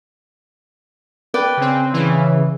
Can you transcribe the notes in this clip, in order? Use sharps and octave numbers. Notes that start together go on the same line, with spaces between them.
B4 D5 G5
C#3 C4
C#3 E3